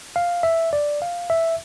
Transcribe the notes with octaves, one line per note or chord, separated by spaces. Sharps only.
F5
E5
D5
F5
E5